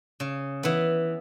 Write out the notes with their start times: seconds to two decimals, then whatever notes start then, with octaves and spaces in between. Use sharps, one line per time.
0.20 C#3
0.63 E3 B3